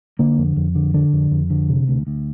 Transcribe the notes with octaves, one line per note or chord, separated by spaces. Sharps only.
D3 A#3
F2
F2
D3
D3 D4
F2
F2
D3
C3
D2
D2